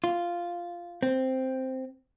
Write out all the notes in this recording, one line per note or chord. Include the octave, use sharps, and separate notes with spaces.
F4
C4